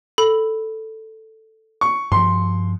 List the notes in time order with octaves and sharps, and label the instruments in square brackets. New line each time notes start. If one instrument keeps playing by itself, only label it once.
[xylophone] A4 B5
[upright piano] C#6
[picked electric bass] G2 F3 [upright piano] C6